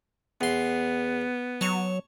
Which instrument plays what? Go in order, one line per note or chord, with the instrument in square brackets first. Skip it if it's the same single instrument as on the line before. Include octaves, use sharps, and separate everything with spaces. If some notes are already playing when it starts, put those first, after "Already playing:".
[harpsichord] E2 C6 [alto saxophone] B3
[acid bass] F#3 [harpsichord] C#5 A5